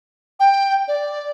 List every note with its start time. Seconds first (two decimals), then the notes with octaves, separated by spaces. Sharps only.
0.40 G5
0.88 D5